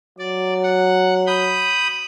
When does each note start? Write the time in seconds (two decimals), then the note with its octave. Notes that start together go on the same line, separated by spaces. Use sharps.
0.19 F#3 D5
0.63 F#5
1.27 B5 D#6 G6